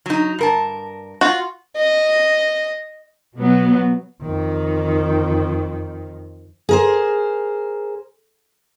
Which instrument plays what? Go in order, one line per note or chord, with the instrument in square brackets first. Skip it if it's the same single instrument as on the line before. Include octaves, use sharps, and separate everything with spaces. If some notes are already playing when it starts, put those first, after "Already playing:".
[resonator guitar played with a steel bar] F#3 D#4
G2 A#4 A5
[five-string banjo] F4 F#4
[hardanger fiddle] D#5
[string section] B2 F#3 B3
[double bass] F2 D#3
[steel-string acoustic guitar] G#4 A#4 C5